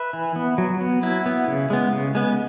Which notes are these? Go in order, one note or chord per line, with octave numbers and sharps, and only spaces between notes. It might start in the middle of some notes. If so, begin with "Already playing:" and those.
Already playing: B4 E5
E3
B3
F#3
B3
F#3 E4
B3
C#3
G#3 B3
C#3
G#3 B3